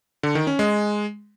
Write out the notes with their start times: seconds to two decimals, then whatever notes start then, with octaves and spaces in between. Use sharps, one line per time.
0.23 D3
0.35 D#3
0.47 C#4
0.59 G#3